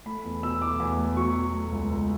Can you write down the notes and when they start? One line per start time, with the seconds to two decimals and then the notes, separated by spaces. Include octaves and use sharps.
0.06 A3 B5
0.25 E2
0.43 B2 E6
0.61 A3 D6
0.80 E2
0.98 A3
1.17 F#3 C#6
1.35 B2
1.54 A3
1.72 C#2
1.90 C#2